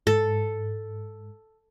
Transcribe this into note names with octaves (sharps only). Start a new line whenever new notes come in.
G#2 A4